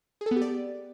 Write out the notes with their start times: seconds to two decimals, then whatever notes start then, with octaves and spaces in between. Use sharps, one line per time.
0.21 G#4
0.26 A4
0.31 B3
0.36 G4
0.41 D5